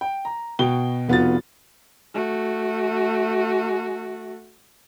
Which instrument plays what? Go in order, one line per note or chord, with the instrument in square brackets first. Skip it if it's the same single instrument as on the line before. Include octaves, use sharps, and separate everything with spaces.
[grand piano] G5
A#5
B2 F#4 G5 G7
F1 B3 F4 F#4 A4 A6
[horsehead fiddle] A3 F#4